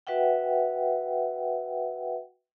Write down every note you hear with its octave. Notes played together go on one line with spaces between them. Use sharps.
F#4 B4 E5 F#5 G5